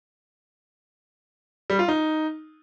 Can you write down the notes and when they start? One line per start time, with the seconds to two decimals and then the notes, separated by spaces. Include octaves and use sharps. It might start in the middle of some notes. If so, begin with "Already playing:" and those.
1.70 G3
1.79 F4
1.88 D#4